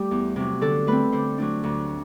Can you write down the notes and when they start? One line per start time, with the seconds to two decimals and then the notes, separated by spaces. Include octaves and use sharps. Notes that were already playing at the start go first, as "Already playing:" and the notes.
Already playing: G3 A3 G4
0.11 E2
0.36 C3 F#3
0.61 D3 A4
0.87 A3 C4 B4
1.12 D3 C5
1.38 F#3 A3 D4
1.64 D2